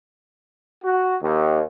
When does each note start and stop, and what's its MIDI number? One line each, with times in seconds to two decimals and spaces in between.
0.84 1.16 66
1.23 1.61 39